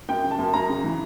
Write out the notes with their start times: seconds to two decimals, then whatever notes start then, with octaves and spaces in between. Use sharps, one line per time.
0.09 F#2 G5
0.23 C#3
0.31 A5
0.38 F#2
0.53 F#2 A#5
0.69 C#3
0.84 E3